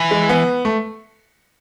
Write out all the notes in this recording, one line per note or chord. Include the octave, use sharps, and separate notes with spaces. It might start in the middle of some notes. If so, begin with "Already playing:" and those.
Already playing: E3
G#3
B3
A3